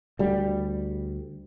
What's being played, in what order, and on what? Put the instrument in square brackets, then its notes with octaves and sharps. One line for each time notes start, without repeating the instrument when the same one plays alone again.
[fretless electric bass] D2 G3